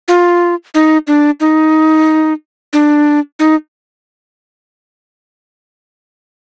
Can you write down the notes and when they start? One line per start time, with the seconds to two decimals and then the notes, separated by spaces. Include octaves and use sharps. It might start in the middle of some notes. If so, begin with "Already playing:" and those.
0.08 F4
0.74 D#4
1.07 D4
1.40 D#4
2.73 D4
3.39 D#4